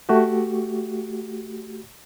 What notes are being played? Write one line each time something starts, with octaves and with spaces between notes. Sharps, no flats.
A3 F#4 G4